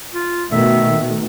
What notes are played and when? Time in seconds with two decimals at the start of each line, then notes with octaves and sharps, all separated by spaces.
0.14 F4
0.52 B2 D#3 A3 E5